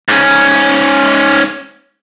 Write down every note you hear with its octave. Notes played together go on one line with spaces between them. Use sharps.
G#2 C#4